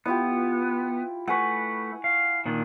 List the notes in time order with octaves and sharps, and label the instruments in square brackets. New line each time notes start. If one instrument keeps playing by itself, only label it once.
[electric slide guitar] B3 [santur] E4 F4 G4
[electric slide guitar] A3 B4 [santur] F#5 G#5 C#6
[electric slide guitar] F5
A#2 D#3 D4